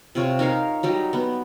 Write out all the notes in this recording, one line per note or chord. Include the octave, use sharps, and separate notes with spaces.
C3 F4 C#5
D#4 A#4 C#5 F5
F#3 G3 D#4
B3